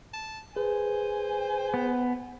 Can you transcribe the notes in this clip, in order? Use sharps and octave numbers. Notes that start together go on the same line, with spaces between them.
A5
G#4 B4 C5 G#5
B3